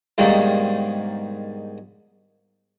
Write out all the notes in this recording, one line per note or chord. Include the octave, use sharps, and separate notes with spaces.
G#2 B2 D#3 G3 A#3 D4